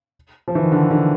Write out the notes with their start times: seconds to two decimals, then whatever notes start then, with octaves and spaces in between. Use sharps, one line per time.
0.48 F3
0.55 E3
0.63 D#3
0.72 D3
0.91 D3